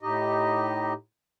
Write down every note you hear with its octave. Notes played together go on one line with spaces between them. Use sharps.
A2 D#4 G4 D#5